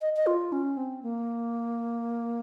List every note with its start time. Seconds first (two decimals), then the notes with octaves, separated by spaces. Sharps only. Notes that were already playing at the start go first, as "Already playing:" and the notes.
0.02 D#5
0.16 D#5
0.27 F4
0.52 C#4
0.77 C4
1.03 A#3